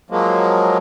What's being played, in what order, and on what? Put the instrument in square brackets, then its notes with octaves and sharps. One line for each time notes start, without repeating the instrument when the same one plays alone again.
[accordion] F3 F#3 G#3 A#3